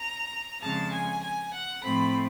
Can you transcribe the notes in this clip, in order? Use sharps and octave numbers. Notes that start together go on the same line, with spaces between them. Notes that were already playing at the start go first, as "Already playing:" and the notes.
Already playing: A#5
F2 C#3 F3 G#3 A5
G#5
G#5
F#5
A2 F3 A3 C4 B5